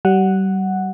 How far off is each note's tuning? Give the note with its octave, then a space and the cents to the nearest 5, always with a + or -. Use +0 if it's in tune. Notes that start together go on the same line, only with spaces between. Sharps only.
G3 -35 F#5 +0